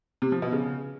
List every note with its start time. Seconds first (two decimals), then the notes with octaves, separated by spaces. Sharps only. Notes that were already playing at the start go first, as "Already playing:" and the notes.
0.22 C3
0.32 F3
0.42 B2
0.52 C#3